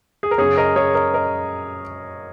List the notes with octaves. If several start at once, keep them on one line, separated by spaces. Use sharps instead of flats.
G#4
A#4
F#2 C#3 G#4 C#5
A#4 D#5
G#4 C#5
A#4 D#5
A#4 D#5